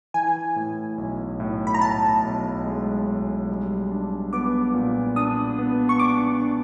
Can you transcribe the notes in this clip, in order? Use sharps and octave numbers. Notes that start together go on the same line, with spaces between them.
E3 G#5
A2
B1
A2
B5
A#5
A2 A5
B1
G#3
B1
G3
D4
B3 D6
A#2
D4 D#6
B3
C#6
D4 D6
D4